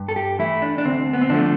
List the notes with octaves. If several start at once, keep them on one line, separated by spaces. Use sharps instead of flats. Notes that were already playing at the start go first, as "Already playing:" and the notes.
Already playing: G2
A4
G4
E3 A3 E4
D4
D4
D2 C4
B3
C4
D3 F3 A3 D4